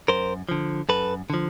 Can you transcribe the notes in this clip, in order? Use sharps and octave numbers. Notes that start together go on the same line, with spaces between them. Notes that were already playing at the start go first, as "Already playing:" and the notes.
F#2 A#4 C5
D3 F3
F#2 A4 B4
D3 F3